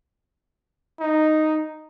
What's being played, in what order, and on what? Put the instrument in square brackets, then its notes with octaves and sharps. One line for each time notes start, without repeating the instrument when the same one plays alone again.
[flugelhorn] D#4